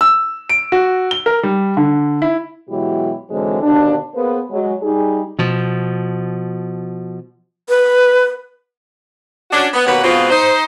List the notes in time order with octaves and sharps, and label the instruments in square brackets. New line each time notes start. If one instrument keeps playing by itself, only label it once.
[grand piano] E6
D7
F#4
G7
A#4
G3
D3
E4
[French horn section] B2 E3 F#3 G#3 E4 G4
G#2 D3 E3 F#3 G#3 C4
D#2 B2 D3 D4
A#3 B3 G#4 B4 C5
F#3 G#3
G3 D#4 G#4
[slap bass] B2 F3
[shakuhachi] B4
[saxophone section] C#4 D4 F#4
B3
D#2 B2 A#3 B4 C#5 F#5
G#2 B2 B3 C4 F4
D#4 C5